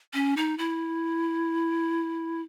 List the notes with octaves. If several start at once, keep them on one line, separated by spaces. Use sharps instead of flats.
C#4
D#4
E4